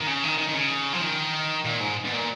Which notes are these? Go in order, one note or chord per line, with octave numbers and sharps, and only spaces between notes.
D#3
C#3
D#3
D#3
D#3
C#3
F3
D#3
A#2
G#2
B2
A#2